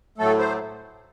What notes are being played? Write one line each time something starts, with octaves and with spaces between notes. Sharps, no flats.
A2 F#3 A3 A4
C5